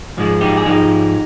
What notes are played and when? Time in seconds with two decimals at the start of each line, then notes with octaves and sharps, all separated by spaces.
0.17 G#2 F3 G#3
0.41 D#4 G4
0.57 G#4
0.65 G#2 F3 G#3 D#4 G4